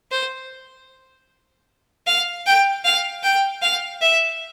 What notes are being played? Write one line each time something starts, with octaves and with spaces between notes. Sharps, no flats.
C5
F5
G5
F5
G5
F5
E5